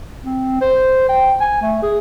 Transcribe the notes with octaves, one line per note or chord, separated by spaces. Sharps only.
C4
C5
G5
G#5
A3
G#4